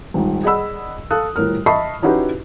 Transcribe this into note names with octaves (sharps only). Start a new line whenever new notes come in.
D#1 G#2
G#4 D5 D#5 F#5 B5 E6
A4 F5 D#6 F#6
D#1 A2 A#4 F6
D#5 E5 A5 B5 C#6 C7
C#4 D#4 E4 F#4 G4 B4